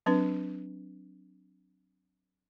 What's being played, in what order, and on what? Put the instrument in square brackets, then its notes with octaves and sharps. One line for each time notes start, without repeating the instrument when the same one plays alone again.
[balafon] F#3 C4 D4 B4